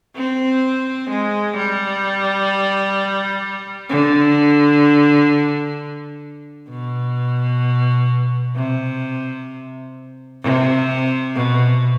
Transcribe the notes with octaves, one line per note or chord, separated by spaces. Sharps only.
C4
G#3
G3
D3
B2
C3
C3
B2